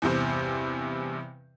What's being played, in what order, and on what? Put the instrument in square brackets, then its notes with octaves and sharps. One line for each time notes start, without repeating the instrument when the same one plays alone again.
[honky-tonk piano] E2 G2 C3 C5